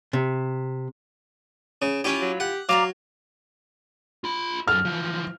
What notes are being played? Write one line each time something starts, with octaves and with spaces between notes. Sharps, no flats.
C3
C#3
C#4 E4 F4 G4
F#3
G4 F#5
F#3 D5 F5 A#5 D6
F4 B5
F#2 A4 F6
E3 F3